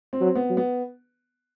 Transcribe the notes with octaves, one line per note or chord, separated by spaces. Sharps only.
C4
F#3
B3
F#3
B3